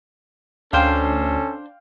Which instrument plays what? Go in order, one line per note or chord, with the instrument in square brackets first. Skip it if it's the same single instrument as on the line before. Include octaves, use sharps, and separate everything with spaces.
[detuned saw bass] D2 [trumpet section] C#4 A4 [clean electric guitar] D4 C5 [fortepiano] F5 G5